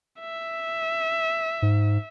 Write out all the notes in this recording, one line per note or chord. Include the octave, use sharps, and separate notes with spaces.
E5
G#2